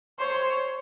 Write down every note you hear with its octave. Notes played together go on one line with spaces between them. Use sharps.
C5 C#5